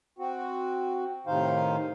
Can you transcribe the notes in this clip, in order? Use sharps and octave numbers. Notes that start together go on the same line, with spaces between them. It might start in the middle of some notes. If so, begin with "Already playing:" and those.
C4 F#4
A2 C3 D#3 D#4 C5 F5